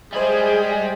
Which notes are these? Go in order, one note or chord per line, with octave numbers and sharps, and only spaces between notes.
G3 G#3 G#4 C5 E5 B5